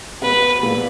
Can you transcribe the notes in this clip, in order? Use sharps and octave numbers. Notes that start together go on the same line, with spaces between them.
B2 B3 B4
A#2 A#3